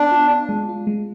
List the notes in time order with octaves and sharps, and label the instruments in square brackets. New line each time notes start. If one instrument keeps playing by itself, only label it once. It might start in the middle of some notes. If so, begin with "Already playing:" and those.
Already playing: [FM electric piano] B3 [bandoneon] D4
[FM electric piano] F4
F4
G#3
F4
G#3